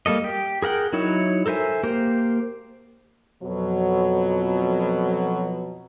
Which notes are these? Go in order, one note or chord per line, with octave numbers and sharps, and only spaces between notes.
G3 A#3 A4 D#5
G4
G#4 A#4 F#5 G5
F#3 D#4 E4 C#5
A4 A#4 C5 E5 G#5
A#3 G4 A#4 C5
F2 B2 F#3